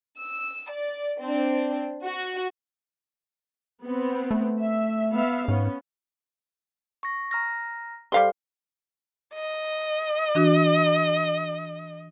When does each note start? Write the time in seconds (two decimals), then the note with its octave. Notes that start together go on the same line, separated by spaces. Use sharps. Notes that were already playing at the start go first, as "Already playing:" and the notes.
0.18 E6
0.70 D5
1.20 C4 D4
2.04 F#4
3.84 B3 C4
4.31 A3
4.61 E5
5.13 B3 E5 F5
5.48 G#2 B3 C#4
7.03 C#6 A#6
7.31 A#5 F6 A#6
8.12 G3 G4 A4 C5 F5 C6
9.35 D#5
10.35 E3 D4 F#4